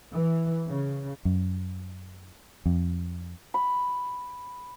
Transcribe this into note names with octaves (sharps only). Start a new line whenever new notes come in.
E3
C#3
F#2
F2
B5